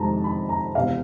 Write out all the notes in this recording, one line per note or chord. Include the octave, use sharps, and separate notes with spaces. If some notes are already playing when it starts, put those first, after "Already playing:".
Already playing: F2 C3 D#3 G#3 A5 A#5
B5
A#5
E1 E2 C3 F5